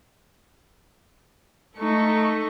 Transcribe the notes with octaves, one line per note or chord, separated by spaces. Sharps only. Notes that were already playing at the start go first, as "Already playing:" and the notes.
A3 D#4 A4 C#6